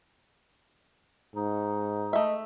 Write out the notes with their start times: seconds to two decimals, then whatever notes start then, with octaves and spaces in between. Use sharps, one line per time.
1.36 G#2 D#4
2.13 A3 D#5 E5